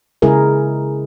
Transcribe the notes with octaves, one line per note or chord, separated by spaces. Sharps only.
C#3 G#3 E4 G#4 A#4